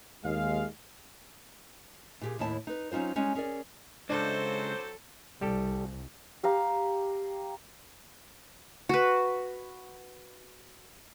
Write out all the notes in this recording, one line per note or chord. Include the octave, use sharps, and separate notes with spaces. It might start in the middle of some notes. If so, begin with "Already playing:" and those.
D#2 G#3 F5
A#2 G4 G#4
D#2 A2 E4 A5
D#4 B4
F#3 C#4 D#4 F4 C5
G3 G#3 C#4 D#4
C#4 G#4 A#4 D5
C#2 F#3 C4 D4 A4 C5
C2 G3 G4 A4
G4 F5 A#5
F#4 B4